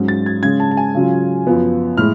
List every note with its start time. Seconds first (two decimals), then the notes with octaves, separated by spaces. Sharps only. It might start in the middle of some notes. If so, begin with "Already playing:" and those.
Already playing: G#2 F#3 C#4
0.08 A6
0.26 G#6
0.43 C#3 G#3 C#4 G#6
0.60 A5
0.71 A5
0.77 G#5
0.94 C#3 F#3 C#4 F4
1.47 F#2 F3 B3
1.97 A2 G#3 F6